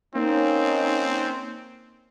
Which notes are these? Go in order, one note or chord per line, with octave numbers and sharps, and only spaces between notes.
A#3 C4 C#4 D#4